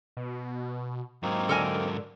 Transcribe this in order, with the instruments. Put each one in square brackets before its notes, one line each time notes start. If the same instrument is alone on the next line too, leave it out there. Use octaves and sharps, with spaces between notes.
[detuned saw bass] B2
[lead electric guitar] G#2 F#3 [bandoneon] A#3 C4 D#4
[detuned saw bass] D3 [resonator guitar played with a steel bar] A4 A#4 G#5